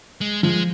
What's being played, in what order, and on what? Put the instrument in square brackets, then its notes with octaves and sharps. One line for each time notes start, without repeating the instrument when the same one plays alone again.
[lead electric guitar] G#3
[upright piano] F3 [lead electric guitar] G#3